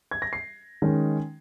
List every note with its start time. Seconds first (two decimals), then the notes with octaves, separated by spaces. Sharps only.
0.11 G#6
0.22 A#6
0.33 C7
0.82 D#3 G#3 C#4